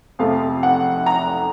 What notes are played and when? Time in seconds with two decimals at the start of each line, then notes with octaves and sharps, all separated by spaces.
0.19 F2 C3 F3 A3 F5
0.63 F#5
1.06 A#5